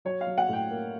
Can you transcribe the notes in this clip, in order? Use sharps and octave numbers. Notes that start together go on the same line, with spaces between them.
F#3 C#5
F5
F#3
F#5
A2 G5
A#3